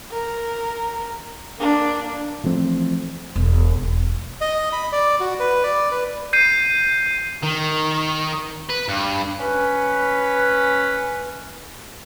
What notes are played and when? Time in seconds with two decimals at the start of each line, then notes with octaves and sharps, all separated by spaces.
0.11 A#4
1.59 A#3 D4
2.44 E3 F3 A3 C4
3.36 E1
3.78 E1
4.41 D#5
4.73 B5
4.92 D5
5.20 F#4
5.40 B4
5.63 D5
5.91 B4
6.33 G6 C7 D#7
7.43 D#3
8.70 B4
8.89 G2
9.38 C#4 B4